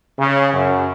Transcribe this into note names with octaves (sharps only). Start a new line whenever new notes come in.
C#3
F#2